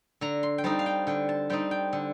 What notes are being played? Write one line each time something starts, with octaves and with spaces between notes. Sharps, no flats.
D3 A#5
C6
G5
G3 C4 D#4 A5
F5
G5
D3 G5
A5
G3 C4 D#4 G5
G5
D3